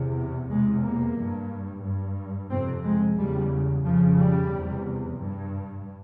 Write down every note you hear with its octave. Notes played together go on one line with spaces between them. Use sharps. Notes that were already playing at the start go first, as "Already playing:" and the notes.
Already playing: E2 C3
E2 C3 G#3
A#3
G2
G2
F2 C3 C4
G#3
E2 C#3 G3
F2 C#3 F3
G3
E2 C3
G2